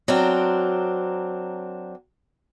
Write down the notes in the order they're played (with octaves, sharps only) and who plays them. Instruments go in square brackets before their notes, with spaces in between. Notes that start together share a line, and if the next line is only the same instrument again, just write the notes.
[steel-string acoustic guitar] F#3 C4 D4 A#4